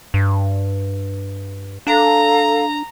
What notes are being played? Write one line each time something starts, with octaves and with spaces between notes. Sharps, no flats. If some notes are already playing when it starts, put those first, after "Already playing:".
G2
D4 A4 F5 A#5